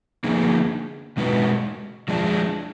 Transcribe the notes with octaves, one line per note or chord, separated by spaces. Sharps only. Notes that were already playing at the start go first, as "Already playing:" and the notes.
D3 F3 A#3 D#4 G#4
B2 G#3 D#4 F#4 B4
F3 G#3 D4